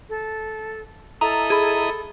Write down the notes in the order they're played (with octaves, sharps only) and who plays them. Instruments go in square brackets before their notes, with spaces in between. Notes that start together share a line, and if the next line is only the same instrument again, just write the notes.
[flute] A4
[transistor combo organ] E4 D#5 D#6 [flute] A4 [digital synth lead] A#5
[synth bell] G#4 B5